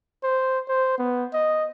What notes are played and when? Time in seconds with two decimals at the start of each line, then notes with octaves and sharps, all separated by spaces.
0.23 C5
0.68 C5
0.99 B3
1.33 D#5